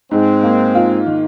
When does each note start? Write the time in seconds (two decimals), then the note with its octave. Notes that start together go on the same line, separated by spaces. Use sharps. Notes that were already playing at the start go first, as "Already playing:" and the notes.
0.11 G#2 G#3 C4
0.43 A#3
0.75 F4
1.07 D#3